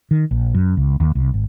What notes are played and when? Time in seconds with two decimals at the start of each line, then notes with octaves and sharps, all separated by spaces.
0.11 D#3
0.31 A#1
0.54 F#2
0.77 C#2
1.00 D#2
1.15 C2
1.34 G#1